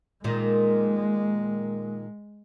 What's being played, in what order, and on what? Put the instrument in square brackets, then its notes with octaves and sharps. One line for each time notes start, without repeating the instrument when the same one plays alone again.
[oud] A#2 D#3 [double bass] G#3